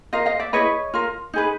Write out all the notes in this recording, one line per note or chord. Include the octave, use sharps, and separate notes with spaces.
F4 A#4 D#5 F5
D#5 F5
D5 E5
E4 G#4 B4 C#5 D#5
F4 A#4
D#4 G#4 B4